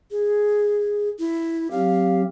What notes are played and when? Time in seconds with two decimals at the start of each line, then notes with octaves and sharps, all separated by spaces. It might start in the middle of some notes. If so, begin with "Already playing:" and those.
0.11 G#4
1.19 E4
1.71 F#3 C4 G4 F5